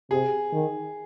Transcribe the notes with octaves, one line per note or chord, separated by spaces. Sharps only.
C3 G#4
D#3